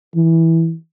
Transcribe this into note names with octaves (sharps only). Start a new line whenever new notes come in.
E3